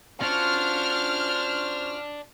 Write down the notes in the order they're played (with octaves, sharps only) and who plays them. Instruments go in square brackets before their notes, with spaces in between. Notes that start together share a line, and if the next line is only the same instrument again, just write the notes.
[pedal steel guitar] C#4 F4 F#4 [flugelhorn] C5 [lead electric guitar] D5 A5 [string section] F6